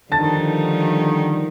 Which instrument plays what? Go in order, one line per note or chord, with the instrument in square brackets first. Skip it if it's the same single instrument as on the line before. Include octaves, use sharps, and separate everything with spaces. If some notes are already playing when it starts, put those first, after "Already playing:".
[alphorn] D3 [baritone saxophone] D#3 [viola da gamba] F3 G3 D#4 [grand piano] A5 A6